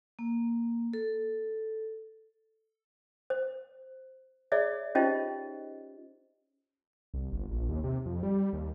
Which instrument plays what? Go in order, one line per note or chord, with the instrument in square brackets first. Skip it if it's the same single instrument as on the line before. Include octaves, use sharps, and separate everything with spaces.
[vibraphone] A#3
A4
[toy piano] C5
G#4 C#5 D5 E5
C#4 D#4 F4 G4 C5 D#5
[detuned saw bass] C2
G1
A#1
D#2
C3
F2
G3
D#2